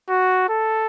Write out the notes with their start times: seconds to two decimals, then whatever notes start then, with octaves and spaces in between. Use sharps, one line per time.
0.10 F#4
0.49 A4